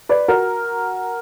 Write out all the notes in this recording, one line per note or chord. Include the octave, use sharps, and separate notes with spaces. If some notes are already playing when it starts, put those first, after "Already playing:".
B4 D5
F#4 A#4